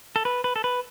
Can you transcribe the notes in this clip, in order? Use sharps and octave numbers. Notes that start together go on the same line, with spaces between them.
A4
B4
B4
A4
B4